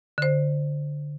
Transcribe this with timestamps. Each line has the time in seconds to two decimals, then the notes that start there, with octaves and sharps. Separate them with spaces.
0.18 D3 C5